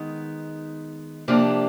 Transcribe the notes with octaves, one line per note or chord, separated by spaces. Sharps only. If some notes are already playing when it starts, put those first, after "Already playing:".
Already playing: D#3 G#3 B3
C3 F3 A#3 D4 G4